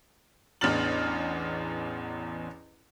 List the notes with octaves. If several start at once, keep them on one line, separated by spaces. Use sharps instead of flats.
A1 E2 D4 F6 A6 F#7